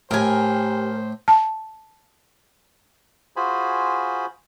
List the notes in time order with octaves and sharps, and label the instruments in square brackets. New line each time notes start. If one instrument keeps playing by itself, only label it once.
[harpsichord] A2 [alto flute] G4 [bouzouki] A#4 G#5 [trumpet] C5
[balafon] A5
[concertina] F4 F#4 G#4 C5 G#5 B5